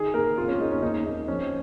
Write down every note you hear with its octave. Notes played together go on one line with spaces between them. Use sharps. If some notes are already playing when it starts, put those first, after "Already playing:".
Already playing: D#3 G#4
A#3 A#4
F2 F4
C#4
G#3 D#4
C#4
D#2 D#4
A#3 D#4
F3 C#4